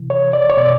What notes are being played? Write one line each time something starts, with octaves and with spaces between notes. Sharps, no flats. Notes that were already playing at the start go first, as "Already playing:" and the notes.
Already playing: C3 E3
C#5
D5
C#5
B2 D5